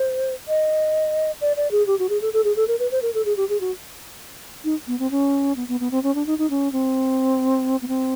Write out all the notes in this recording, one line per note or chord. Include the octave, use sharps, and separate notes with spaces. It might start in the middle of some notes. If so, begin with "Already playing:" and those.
Already playing: C5
D#5
D5
D5
G#4
G4
F#4
G#4
A4
A4
G#4
A4
A#4
B4
C5
A#4
A4
G#4
G4
G#4
F#4
D#4
B3
C4
C#4
B3
B3
B3
C4
C#4
D4
D#4
D#4
C#4
C4
B3
C4